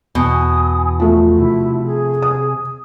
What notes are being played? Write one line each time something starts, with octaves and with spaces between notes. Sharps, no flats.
E2 B2 G#5 D#6
F3 A3
C3 E4
G#4
D#6